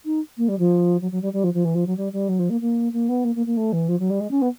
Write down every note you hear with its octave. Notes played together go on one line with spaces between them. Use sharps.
D#4
A#3
G3
F3
F#3
F#3
G3
G3
F3
F3
E3
F3
F#3
G3
G3
F#3
F3
A#3
A#3
A#3
B3
A#3
A#3
A#3
A3
E3
F3
F#3
G3
G#3
C#4
B3